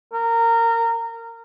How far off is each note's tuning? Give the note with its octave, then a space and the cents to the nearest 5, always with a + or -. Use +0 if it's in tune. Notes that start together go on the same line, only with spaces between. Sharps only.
A#4 -20